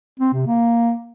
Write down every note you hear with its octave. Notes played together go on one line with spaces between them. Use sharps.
C4
C3
A#3